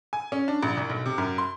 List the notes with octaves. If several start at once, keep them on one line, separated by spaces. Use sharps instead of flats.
G#5
C#4
D4
A#1
C2
B1
C3
F#2
C6